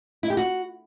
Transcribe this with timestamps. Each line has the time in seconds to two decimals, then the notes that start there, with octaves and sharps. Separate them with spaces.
0.23 E4
0.30 G4
0.37 F#4